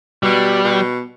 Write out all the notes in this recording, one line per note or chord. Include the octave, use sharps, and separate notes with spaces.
B2 G3
B2